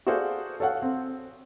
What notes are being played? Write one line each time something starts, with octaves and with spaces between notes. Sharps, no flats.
F#4 G#4 A4 C5 D5 F5
A4 C#5 F5 F#5
C4